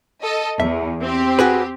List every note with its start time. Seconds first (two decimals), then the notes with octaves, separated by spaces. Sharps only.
0.23 A4 D#5
0.60 E2 E5
1.01 C4 G4
1.39 F#4 G#4 B4